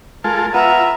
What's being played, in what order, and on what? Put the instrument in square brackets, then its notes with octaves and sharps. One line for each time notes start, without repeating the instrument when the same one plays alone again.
[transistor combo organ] G#3 F4 A4 [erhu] A#4
[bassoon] B3 [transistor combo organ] F4 [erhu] E5 [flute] A#5